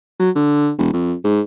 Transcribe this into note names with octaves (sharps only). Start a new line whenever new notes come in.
F#3
D3
E1
F2
G#2